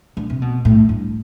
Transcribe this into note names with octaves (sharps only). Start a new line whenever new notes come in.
D3
C3
B2
A2
G2